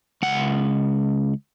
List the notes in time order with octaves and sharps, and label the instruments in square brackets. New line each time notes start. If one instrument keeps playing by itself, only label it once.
[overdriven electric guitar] C#2 F#5